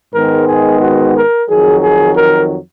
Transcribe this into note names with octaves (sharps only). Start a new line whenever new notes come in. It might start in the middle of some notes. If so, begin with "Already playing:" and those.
G#2 D#3 G#3 B3 A#4
G#4
F#4
A#4
F2 D#3 F#3 G#4
G#4
A#4